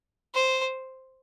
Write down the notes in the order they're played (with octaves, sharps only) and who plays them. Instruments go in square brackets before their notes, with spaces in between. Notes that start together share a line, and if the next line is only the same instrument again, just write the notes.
[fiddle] C5